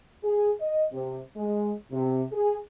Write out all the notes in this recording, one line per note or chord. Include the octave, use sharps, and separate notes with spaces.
G#4
D#5
C3
G#3
C3
G#4